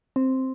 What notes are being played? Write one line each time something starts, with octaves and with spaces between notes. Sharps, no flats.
C4